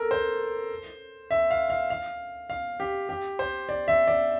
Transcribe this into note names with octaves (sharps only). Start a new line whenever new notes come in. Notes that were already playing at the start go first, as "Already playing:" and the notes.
Already playing: A4 A#4
C5
E5
F5
F5
F5
F5
G4
G4
C5
D5
E5
D5